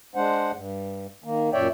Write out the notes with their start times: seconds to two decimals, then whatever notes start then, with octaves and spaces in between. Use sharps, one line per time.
0.15 G#3 D4 C5 F#5
0.53 G2
1.24 D#3 A#3
1.53 F#2 A#2 C#5 D5 E5 G5